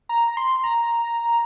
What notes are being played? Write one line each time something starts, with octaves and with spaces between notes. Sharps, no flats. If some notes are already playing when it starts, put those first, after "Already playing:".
A#5
A#5
C6
A#5